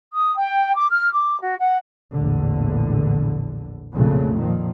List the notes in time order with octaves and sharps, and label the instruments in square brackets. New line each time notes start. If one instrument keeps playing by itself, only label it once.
[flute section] D#6
G5
D6
F6
D6
F#4
F#5
[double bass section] A#1 E2 A2 D3
B1 F2 A#2 C#3 A3
A#2 D#3 F3